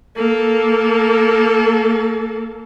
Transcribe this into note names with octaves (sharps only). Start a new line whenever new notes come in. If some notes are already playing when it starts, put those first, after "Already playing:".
A#3 A4